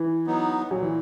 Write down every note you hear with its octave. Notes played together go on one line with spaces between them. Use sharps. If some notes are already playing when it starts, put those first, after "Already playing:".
Already playing: E3
F#3 B3 D#4
A#2 F#3
E3